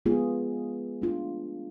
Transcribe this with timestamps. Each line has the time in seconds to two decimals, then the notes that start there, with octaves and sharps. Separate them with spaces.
0.06 G#3 B3 F4 G#4
1.02 A3 D4 F4